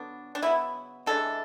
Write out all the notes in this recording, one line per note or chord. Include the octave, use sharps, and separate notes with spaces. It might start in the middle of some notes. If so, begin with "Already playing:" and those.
Already playing: D3 F#3 B3 D4
D4
C#3 F#3 B3 E4
C#3 E3 G#3 D4 A4